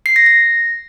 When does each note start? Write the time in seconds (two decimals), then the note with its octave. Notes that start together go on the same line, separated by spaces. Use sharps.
0.06 C7
0.16 A#6
0.26 A#6